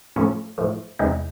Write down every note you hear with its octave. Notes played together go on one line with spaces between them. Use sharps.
A2 F3 A3 C#4
A2 F3 A3
E2 C3 E3 G#3 D#4